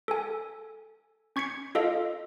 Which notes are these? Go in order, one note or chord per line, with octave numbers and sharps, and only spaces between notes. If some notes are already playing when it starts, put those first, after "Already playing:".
A4 G#5
C#4 C#6 G#6 B6 C#7
F4 A4 D#5 F5